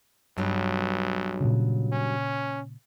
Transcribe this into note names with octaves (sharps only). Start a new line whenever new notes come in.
B1 G2 F#3
A#2 C#3
C#4